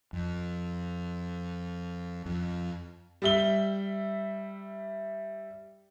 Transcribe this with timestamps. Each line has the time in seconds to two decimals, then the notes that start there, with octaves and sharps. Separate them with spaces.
0.13 F2
2.26 F2
3.22 G3 E5 G7